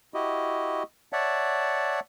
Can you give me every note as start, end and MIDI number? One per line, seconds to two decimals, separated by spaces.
0.14 0.83 64
0.14 0.83 66
0.14 0.83 67
0.14 0.83 75
1.13 2.00 73
1.13 2.00 74
1.13 2.00 76
1.13 2.00 78
1.13 2.00 81